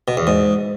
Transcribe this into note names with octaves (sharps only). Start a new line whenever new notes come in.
B2
E2
G#2